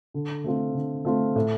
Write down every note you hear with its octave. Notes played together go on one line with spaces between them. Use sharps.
D3
A3 C4 F4
D3
A3 C4 F4
A2